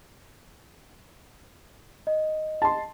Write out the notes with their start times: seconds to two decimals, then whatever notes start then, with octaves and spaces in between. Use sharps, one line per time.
2.07 D#5
2.62 A5 C6